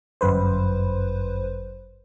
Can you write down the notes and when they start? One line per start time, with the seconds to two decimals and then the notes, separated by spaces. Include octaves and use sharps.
0.21 G1 F#2 B4 C5